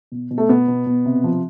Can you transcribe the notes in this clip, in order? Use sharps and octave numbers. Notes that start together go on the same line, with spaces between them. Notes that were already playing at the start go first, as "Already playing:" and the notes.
B2
B2
A3
B2 B3
B2
B2
C3
F3